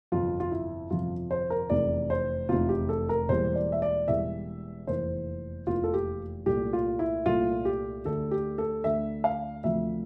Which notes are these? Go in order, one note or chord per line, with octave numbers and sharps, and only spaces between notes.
G1 F2 C3 F3 F4
F4
E4
G1 F2 C3 F3 F4
C5
A#4
F1 E2 C3 D5
C5
F1 E2 C3 F4
G4
A4
A#4
E1 E2 E3 G3 A#3 C5
D5
E5
D5
E1 E2 E3 G3 A#3 E5
F1 E2 E3 A#3 C5
F1 E2 E3 A#3 F4
A4
G4
C2 A#2 A3 G4
F4
E4
C2 A#2 A3 F4
G4
D2 D3 A3 A4
G4
A4
D2 D3 A3 E5
F5
D2 C3 F3 E5